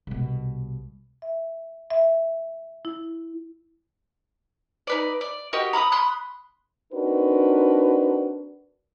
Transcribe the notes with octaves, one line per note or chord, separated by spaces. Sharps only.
C2 B2
E5
E5
E4
D#4 B4 D5
D5
F#4 G4 A#4 D#5
A#5 B5 D6 D#6
B5 C6 D#6 F#6
C4 D4 D#4 F#4 A#4 B4